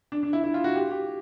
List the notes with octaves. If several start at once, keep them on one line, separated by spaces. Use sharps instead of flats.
D4
D4
E4
E4
F4
F#4
G4
G4